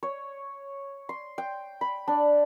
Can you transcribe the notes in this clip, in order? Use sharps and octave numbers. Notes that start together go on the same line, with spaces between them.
C#5
C6
G5
B5
D4